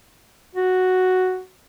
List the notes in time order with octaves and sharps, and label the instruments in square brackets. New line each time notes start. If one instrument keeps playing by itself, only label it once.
[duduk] F#4